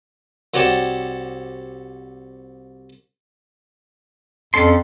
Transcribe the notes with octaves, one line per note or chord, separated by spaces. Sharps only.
C2 F#4 C#5 D5 G5 A5
F2 C#4 A4 C6